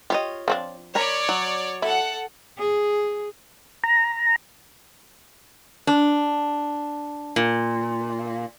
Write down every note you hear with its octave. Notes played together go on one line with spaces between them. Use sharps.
F4 G4 C#5 D#5
F3 C4 D4
A#4 C#5 D5 A#5 B5
F#3
E4 A4 F#5
G#4
A#5
D4
A#2